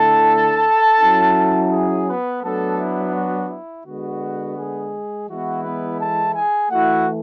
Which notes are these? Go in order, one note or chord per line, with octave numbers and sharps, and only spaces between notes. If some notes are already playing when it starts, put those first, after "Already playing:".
Already playing: D3 A3 E4 A4 A5
F#3 C#4 E4
G#4 G#5
B3 B4
F#3 A3 B3 D4 A4
E4
F#4
E4
D3 G#3 B3 F#4
G#3 G#4
E3 G#3 B3 E4 F#4
B3 B4
A4 A5
G#4 G#5
E3 A3 E4 F#4 F#5